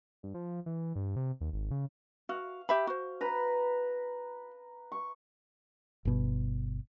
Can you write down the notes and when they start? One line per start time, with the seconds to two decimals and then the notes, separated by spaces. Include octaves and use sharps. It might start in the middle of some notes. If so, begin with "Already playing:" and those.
0.23 G2
0.34 F3
0.66 E3
0.95 G2
1.16 C3
1.41 D#2
1.53 G#1
1.71 C#3
2.29 F#4 F5
2.69 G4 E5 B5
2.87 F#4 C5
3.21 B4 A#5 B5
4.92 C#6
6.05 G1 B2